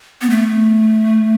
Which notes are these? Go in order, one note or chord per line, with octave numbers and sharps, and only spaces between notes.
B3
A3